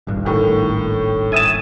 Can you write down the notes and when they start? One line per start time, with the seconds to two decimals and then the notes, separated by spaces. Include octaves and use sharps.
0.07 D#1 G#1 G2
0.25 A2 D#3
1.32 E5 G#5 A5 D#6